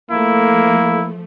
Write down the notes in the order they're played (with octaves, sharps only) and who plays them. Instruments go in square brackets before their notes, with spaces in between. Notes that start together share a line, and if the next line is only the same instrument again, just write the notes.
[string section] F3 A3 [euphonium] A#3 [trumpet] E4